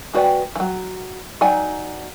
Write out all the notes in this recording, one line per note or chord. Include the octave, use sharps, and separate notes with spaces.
G#3 F#4 B4 D5 G5
E3 F#3
F#3 D#4 D5 G#5